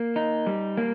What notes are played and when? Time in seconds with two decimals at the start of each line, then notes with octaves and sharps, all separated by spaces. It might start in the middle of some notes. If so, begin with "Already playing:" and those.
Already playing: A#3
0.16 D#4
0.47 G3
0.77 A#3